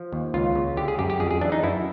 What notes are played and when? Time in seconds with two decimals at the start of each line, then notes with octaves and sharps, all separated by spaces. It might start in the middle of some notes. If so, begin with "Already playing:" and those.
Already playing: F3
0.13 D#2
0.34 C#2 F4
0.55 C#3
0.77 D3 G4
0.88 G#4
0.98 F#2 G4
1.10 G4
1.20 F2 G#4
1.31 G#4
1.41 E3 D4
1.52 D#4
1.63 F#2 E4